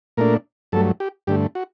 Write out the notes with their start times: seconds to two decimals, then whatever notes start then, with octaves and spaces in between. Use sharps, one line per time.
0.17 A#2 A3 D4 A#4
0.72 G2 F#3 A3 A4
1.00 G4
1.27 G2 D3 A3 G4
1.55 F#4